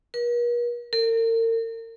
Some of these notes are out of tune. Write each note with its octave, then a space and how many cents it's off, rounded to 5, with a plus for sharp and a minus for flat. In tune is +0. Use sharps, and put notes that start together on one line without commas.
A#4 +45
A#4 -40